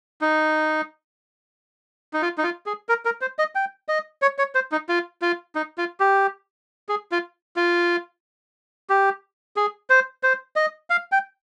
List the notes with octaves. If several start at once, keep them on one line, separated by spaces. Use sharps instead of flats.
D#4
D#4
F4
D#4
F4
G#4
A#4
A#4
C5
D#5
G5
D#5
C#5
C#5
C5
D#4
F4
F4
D#4
F4
G4
G#4
F4
F4
G4
G#4
C5
C5
D#5
F5
G5